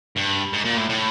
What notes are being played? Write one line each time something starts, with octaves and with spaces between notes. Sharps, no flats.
G2
G#2
A#2
A2
A2